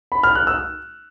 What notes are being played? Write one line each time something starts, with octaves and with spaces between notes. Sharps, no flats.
B5
F6
F#6
E6